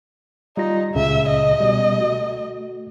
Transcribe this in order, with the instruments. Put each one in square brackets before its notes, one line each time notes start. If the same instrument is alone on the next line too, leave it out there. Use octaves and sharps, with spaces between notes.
[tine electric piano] G3 F4 A#6 [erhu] D#4
[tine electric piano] C#2 A#2 C#3 [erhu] E5
[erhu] D#5
[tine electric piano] B2 G3
A3 F#4